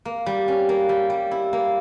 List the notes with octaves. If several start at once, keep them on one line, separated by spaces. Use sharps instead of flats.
A#3
G3
C#4
A#3
G3
G3
E4
A#3